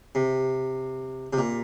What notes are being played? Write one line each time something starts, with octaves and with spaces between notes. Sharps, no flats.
C3
C3
A#2